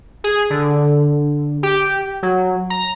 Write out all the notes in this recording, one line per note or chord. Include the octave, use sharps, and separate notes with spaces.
G#4
D3
G4
F#3
A#5